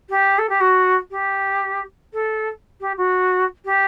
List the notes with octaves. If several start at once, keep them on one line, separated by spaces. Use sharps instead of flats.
G4
A4
G4
F#4
G4
A4
G4
F#4
G4